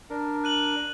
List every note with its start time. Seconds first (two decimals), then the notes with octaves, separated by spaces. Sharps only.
0.10 D4 A#4
0.44 F#6 D#7 F#7